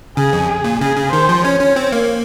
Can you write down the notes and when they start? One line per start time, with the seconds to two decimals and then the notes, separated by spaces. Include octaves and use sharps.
0.17 C#3 G#4
0.33 F2
0.48 G#4
0.64 A#2
0.80 C#3 G#4
0.97 C#3
1.12 D#3 C5
1.29 F3
1.44 C#4 C#5
1.60 C#4
1.76 C4
1.92 A#3